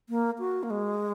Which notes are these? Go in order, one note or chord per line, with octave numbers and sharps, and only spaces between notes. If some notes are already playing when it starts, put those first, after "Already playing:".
A#3
F#4
A#3
G#3